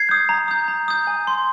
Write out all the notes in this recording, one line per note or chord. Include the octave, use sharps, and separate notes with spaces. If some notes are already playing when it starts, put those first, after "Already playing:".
Already playing: G#6 C7
D#6 G6
A#5
D#6 G6
A#5
D#6 G6
G#5
C6 D#6